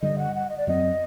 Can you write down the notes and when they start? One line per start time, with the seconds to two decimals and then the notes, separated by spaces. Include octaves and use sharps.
0.01 G2 D3 G3 D#5
0.18 F#5
0.35 F#5
0.49 D#5
0.57 D5
0.67 F#2 F#3 C4 D#5